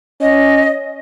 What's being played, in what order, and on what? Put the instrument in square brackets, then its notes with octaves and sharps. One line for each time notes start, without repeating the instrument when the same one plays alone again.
[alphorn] C#4 [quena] D#5